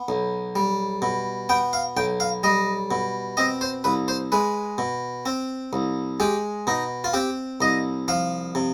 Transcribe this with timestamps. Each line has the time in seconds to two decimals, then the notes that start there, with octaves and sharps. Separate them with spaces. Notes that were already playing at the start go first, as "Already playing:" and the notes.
Already playing: B3
0.08 B1
0.56 G3
1.02 B2
1.49 B3 G5
1.73 F5
1.97 B1 G5
2.20 F5
2.43 G3 D#5
2.91 B2
3.37 C4 D#5
3.61 C5
3.84 C2 B4
4.08 C5
4.32 G#3 B4
4.78 B2
5.26 C4
5.73 C2
6.20 G#3 G4
6.67 B2 D#4
7.04 F4
7.14 C4 G4
7.61 C2 D#5
8.08 F3 F5
8.55 C3